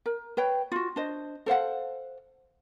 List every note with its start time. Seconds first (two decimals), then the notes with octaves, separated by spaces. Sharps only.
0.06 A#4
0.37 B4 C#5 G5
0.72 F4 F#4
0.96 D4 C5 D#5
1.46 A4 C5 F5 F#5